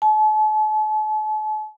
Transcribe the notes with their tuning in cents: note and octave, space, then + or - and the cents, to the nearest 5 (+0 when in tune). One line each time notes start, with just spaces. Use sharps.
A5 -40